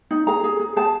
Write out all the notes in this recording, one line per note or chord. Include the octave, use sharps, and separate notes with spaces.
D#4
G#4 A#5
G#4
G#4
G#4 A5